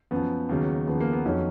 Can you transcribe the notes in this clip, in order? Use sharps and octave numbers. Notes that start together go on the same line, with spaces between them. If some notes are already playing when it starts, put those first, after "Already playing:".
F#2 F3 B3
D#2 C#3 F#3
D#2 C#3 F3 B3
A#3
B3
F2 D#3 F#3 C#4